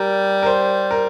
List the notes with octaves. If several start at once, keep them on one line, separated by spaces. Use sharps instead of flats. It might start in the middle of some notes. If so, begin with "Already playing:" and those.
Already playing: G3 A#4
A#4
C5
A#4